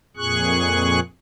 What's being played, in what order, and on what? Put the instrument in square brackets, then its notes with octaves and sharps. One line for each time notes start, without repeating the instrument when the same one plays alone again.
[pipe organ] F2 A#2 G#4 C#6 F#6